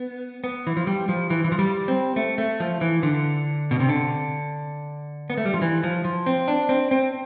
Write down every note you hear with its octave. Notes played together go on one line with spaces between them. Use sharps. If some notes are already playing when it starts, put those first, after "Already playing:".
Already playing: B3
B3
E3
F3
G3
F3
E3
E3
F3
G3
C4
A3
A3
F3
E3
D3
B2
C3
D3
B3
A3
G3
F3
E3
F3
F3
C4
D4
C4
C4